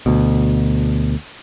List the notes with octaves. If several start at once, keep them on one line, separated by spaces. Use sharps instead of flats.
D2 B2